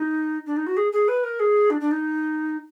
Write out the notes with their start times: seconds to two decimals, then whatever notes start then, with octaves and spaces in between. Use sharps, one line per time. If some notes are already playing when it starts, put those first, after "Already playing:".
Already playing: D#4
0.46 D4
0.56 D#4
0.67 F#4
0.77 G#4
0.92 G#4
1.08 B4
1.24 A#4
1.40 G#4
1.70 D4
1.81 D4
1.91 D#4